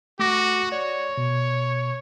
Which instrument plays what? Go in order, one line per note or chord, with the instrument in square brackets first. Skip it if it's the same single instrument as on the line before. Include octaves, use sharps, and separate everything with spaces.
[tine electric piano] A3 D6 A#6 [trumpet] F#4
[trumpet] C#5 [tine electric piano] D5
[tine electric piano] B2